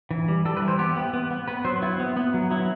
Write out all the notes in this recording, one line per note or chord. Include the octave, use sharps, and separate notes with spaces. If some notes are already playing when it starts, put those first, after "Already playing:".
E3
G3
G3 A4
B4
E3
C5
B3 G4
B3
B3
B3
B3 B4
F#3 C5
B3 E4
B3
B3
F#3
F#3 E4